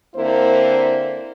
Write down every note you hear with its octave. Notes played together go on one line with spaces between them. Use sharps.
D3 A#3 C4 E4 A#4 C5